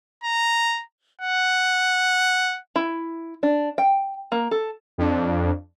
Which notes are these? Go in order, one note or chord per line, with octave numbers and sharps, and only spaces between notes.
A#5
F#5
E4
D4
G5
A#3
A4
F2 D4